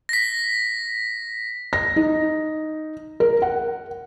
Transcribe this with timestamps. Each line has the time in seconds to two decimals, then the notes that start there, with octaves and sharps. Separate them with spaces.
0.09 A#6 B6
1.73 A#6
1.96 D#4
3.20 A#4
3.42 F#5